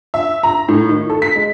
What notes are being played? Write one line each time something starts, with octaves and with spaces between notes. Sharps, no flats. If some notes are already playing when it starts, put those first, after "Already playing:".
E5
A#5
A2
D#3
A4
B6
G#3